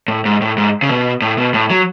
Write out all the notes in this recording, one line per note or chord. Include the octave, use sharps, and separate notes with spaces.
A2
G#2
A2
G#2
C#3
B2
A2
B2
A2
F#3